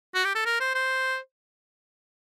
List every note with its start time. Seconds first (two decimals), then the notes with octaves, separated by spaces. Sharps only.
0.15 F#4
0.25 G4
0.35 A4
0.46 A#4
0.60 C5
0.75 C5